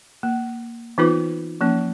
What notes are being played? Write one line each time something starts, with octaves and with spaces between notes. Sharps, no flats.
A#3
E3 B3 D#4 F4 B4 D6
F3 A#3 C#4